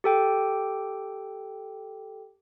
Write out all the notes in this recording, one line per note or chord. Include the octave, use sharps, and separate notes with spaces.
G4 A4 G5